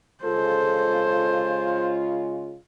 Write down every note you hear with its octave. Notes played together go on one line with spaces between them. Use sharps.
C#3 G#3 F4 A4 C5